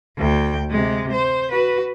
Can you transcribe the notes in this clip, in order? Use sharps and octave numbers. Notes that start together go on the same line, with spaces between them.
D2 G5
C3 G#3
C5
F#4 B4